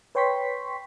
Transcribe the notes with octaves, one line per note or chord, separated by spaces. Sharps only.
B4 C#5 G5 C6 C#6 B6